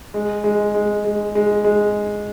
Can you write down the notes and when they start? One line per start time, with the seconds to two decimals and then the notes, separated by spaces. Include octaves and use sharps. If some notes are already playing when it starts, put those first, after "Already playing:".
0.14 G#3
0.44 G#3
0.75 G#3
1.05 G#3
1.35 G#3
1.64 G#3